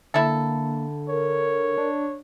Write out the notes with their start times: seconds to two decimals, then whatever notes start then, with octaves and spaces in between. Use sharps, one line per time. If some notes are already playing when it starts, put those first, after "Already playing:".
0.14 D3 A#3 E4 A4
1.09 A#4 C#5
1.78 D4